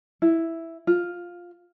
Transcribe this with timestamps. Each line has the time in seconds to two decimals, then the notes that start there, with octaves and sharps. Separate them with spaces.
0.22 E4
0.87 F4